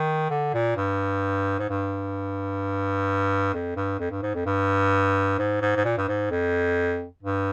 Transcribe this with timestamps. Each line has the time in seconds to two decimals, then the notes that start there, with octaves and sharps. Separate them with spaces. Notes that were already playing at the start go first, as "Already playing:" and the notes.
Already playing: D#3
0.30 D3
0.54 A#2
0.76 G2
1.59 G#2
1.69 G2
3.54 F2
3.76 G2
3.99 F2
4.11 G2
4.22 G#2
4.35 F2
4.46 G2
5.39 G#2
5.62 G#2
5.76 G#2
5.85 A#2
5.98 G2
6.08 G#2
6.31 F2
7.23 G2